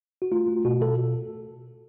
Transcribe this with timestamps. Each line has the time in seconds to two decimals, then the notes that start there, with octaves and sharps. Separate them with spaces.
0.22 F#4
0.32 A3 F4
0.48 A3
0.65 B2 F#4
0.81 B2 A4